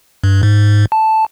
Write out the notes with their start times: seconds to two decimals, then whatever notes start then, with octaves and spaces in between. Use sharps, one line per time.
0.24 G2
0.43 G#2
0.92 A5